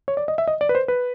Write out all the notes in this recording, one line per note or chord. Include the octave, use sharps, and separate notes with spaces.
C#5
D5
D#5
E5
D#5
D5
B4
C5
B4